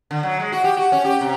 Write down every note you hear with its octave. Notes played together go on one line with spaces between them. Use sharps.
D3
F#3
G#3
F#4
G4
F#4
C#4
G4
C3